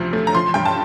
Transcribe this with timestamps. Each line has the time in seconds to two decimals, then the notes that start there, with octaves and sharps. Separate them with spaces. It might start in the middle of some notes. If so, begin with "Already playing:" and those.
Already playing: D2 C3 F3
0.13 A3
0.27 A#5
0.35 F3 C6
0.54 G2 G5
0.65 A5